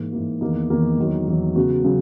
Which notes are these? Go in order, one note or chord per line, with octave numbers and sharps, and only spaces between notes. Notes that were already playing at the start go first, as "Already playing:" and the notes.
Already playing: G#2 E3 A#3
G#2 E3 A#3
E2 D#3 A#3 D#4
E2 D#3 A#3 D#4
E2 D#3 F#3
E2 D#3 F#3
C#3 F#3 B3 F#4
C#3 F#3